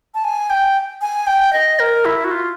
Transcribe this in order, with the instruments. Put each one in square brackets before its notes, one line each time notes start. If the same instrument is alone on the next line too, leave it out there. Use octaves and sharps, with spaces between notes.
[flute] A5
G#5
G5
G#5
G5
D#5
A#4
E4
F#4
F4